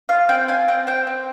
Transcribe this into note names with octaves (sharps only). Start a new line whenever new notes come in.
F4 F5
C4 G5
F4 G#5
C4 G5
C4 G5
C4